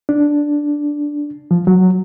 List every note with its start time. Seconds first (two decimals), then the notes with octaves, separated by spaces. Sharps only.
0.09 D4
1.51 F3
1.67 F#3